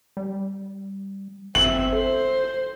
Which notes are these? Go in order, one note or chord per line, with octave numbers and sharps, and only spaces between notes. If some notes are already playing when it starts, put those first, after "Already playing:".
G3
G1 C4 E5 F#7
A4 C5